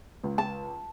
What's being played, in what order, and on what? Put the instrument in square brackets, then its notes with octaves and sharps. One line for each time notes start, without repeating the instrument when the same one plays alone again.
[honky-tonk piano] C#2
[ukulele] A5